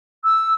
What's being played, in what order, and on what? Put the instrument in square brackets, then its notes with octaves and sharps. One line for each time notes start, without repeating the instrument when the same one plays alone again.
[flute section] E6